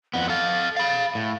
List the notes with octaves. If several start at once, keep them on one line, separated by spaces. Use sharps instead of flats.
F2 B3 F#5
A4 F5 A6
F5 B5
A2